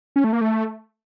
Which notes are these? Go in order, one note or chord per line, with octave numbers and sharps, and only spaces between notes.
C#4
A3
A#3
A3